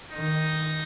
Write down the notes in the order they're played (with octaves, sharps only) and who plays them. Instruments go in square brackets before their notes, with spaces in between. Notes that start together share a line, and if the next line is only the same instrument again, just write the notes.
[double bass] D#3 [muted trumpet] D#4